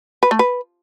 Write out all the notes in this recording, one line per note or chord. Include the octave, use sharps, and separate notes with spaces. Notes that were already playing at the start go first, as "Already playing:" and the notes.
B4
A3
B4